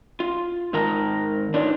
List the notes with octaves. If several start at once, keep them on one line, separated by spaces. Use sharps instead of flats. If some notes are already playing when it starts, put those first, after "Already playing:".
F4
G#2 D#3 A#4 A5 A#5
D4 D#4 F4 B4 C#5 D5